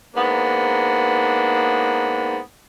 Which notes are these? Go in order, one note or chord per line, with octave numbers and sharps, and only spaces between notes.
G#2 A#3 B3 D4